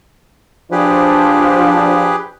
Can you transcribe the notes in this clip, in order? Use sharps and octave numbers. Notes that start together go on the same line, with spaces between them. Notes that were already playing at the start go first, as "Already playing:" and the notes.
F3 D4 G4 G#4 B4